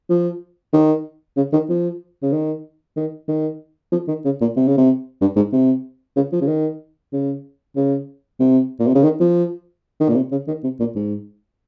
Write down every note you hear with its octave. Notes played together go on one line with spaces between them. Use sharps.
F3
D#3
C#3
D#3
F3
C#3
D#3
D#3
D#3
F3
D#3
C#3
A#2
C3
C#3
C3
G2
G#2
C3
C#3
F3
C#3
D#3
C#3
C#3
C3
A#2
C3
C#3
D#3
F3
D#3
A#2
C3
C#3
D#3
C3
A#2
G#2